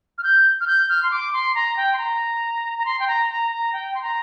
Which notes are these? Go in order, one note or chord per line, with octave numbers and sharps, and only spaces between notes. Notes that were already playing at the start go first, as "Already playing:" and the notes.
F6
G6
F6
G6
F6
C6
D6
C6
A#5
G5
C6
A#5
A#5
C6
G5
A#5
A#5
A#5
G5
C6
A#5